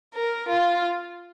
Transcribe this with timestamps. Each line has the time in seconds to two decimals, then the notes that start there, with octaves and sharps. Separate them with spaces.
0.14 A#4
0.49 F4